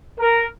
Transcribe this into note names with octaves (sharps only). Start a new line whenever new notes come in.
A#4